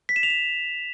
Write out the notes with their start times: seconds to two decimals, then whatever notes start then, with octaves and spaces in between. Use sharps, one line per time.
0.09 B6
0.16 E7
0.23 F7
0.30 E7